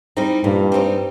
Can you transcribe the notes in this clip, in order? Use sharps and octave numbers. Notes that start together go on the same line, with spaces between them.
G3 C4 D#4
G2 A#2
G3 C4 D#4